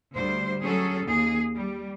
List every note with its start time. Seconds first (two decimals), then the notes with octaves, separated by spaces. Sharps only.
0.15 D2 G3 C5
0.64 F#3 C#4 G#4 A4
1.04 D#2 G#4
1.56 G3